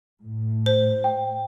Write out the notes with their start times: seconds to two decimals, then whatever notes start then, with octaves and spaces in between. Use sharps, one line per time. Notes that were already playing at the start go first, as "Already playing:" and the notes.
0.22 A2
0.66 C5
1.04 G5